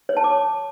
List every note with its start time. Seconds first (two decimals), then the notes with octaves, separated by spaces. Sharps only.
0.09 C#5
0.17 A5
0.24 D6